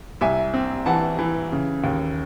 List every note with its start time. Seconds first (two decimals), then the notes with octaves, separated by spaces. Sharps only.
0.21 C2 E5 G#5
0.54 C4
0.86 E3 F#5 A5
1.19 E3
1.52 C#3
1.84 D#2